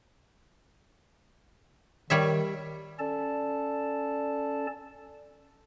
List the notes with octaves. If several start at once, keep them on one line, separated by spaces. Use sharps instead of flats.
D#3 G3 C#5 E5
C#4 A4 D5 A5